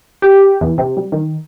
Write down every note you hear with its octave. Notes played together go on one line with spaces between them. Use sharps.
G4
E2
C3
G3
D#3